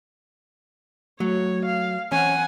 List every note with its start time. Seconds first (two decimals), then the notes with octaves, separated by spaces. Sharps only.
1.20 F#3 A3 C#5
1.65 F5
2.12 E3 C4 C#4 F#5 G#5